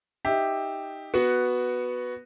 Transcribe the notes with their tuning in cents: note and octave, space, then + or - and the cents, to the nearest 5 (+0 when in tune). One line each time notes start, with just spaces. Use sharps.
D#4 +0 G4 +5 E5 -10
B3 +0 F#4 +0